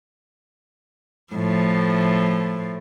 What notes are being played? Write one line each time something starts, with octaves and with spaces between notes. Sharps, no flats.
A2 F3